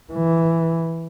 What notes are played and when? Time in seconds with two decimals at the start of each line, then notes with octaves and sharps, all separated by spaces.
0.13 E3